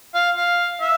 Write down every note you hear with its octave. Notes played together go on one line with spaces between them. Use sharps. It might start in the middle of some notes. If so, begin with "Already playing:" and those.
F5
F5
E5